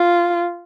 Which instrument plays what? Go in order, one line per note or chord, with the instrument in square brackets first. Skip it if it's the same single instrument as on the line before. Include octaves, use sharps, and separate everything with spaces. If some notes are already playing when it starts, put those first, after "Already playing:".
Already playing: [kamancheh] F4